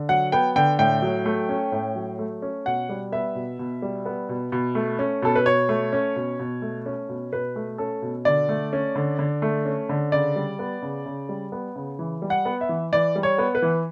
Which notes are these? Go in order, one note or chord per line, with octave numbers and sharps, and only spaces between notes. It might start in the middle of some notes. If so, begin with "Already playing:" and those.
Already playing: D3
F#3 F#5
B3 G5
D3 G5
A2 G5
F#3
A3
C#4
A2
F#3
A3
C#4
B2 F#5
G3
B3 E5
B2
B2
G3
B3
B2
B2
A3
C#4
B2 A4
B4
B2 C#5
A3
C#4
B2
B2
A3
C#4
B2
B2 B4
A3
C#4 A4
B2
D3 D5
A3
C#4
D3
D3
A3
C#4
D3
C#3 D5
G3
B3
C#3
C#3
G3
B3
C#3
E3
G3
F#5
B3
E5
E3
E3 D5
G3
C#5
B3
B4
E3